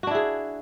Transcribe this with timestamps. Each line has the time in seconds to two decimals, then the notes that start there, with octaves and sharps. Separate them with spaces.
0.03 F#4
0.07 D4
0.11 E4
0.15 G#4